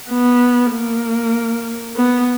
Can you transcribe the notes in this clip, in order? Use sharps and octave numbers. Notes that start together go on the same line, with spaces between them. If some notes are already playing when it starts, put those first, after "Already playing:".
B3
A#3
B3